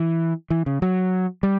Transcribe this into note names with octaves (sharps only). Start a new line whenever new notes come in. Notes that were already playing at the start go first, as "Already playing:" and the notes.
Already playing: E3
E3
C#3
F#3
G3